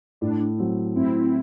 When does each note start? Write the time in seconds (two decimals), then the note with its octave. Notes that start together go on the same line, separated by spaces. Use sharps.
0.21 A2 D4
0.58 F#3 C4
0.96 A2 C4 E4